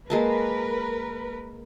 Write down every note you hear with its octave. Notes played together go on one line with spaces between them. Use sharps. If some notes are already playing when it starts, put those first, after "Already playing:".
G#3 A#3 A#4 B4 A5